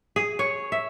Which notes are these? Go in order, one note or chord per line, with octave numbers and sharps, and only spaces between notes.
G#4
C#5
E5